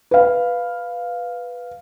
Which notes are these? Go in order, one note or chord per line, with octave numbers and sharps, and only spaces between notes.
B4 F5